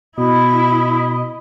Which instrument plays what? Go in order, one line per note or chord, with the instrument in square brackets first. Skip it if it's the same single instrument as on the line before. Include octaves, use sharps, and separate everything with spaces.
[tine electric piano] B2 [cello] E4 [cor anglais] D#5 [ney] B5